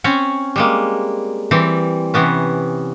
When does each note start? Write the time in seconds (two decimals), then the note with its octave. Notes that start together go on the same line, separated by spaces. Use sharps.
0.04 C4 C#4 C#5
0.56 G3 G#3 A#3
1.51 E3 G3 C4
2.14 C3 E3 B3 C#4